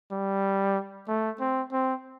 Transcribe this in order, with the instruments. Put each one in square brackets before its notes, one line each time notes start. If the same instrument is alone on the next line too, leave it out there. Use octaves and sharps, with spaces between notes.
[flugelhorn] G3
A3
C4
C4